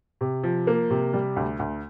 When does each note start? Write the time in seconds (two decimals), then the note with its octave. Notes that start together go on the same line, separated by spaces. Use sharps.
0.21 C3
0.43 F3
0.67 A#3
0.90 C3
1.13 G3
1.36 D2
1.59 D2